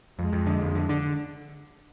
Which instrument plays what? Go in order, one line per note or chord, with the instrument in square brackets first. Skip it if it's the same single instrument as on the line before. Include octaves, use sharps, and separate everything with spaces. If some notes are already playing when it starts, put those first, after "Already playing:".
[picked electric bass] F2 [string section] G#3
[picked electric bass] F2
D3
F2
D3
D3